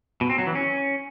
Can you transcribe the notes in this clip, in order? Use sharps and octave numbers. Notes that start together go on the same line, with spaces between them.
B2
C4
F#3
E3
C#4